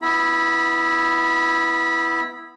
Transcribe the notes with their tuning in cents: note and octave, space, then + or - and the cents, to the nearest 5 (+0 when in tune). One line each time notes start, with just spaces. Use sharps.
B3 +5 E4 +0 B5 -25